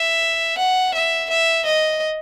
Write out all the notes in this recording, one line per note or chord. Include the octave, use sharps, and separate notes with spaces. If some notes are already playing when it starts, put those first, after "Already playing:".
Already playing: E5
F#5
E5
E5
D#5